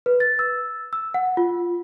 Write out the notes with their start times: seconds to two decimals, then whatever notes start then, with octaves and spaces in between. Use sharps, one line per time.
0.06 B4
0.20 A6
0.39 E6
0.93 E6
1.14 F#5
1.37 F4